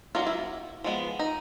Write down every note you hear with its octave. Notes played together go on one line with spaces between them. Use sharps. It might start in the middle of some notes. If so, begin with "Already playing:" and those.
F#3 A#3 C#4 D#4 F4
E4
F3 G#3 B3
D#4